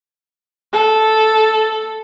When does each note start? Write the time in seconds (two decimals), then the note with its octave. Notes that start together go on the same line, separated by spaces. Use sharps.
0.73 A4